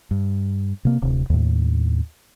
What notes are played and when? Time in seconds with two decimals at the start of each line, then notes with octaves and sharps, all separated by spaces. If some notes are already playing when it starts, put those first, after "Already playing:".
0.11 G2
0.85 C3 A#3
1.02 D1 C3
1.30 D#2 A2